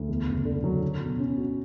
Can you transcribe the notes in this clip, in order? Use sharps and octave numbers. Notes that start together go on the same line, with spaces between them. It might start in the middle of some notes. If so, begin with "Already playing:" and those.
Already playing: D2
E2
F#1
D3
F#3
F#3
B2
C#4
F#4